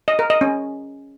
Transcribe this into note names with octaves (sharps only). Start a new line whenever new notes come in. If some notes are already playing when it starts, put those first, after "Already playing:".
D#5
A#4
D#5
C#4